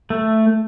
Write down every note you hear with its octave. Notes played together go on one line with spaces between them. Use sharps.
A3